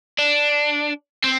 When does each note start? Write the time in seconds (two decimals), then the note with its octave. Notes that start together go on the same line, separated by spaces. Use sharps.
0.19 D4
1.24 C4